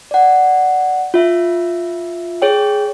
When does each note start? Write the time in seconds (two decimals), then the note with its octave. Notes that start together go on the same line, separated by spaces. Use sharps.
0.11 D5 F#5
1.14 F4 E5
2.42 G#4 C#5 G5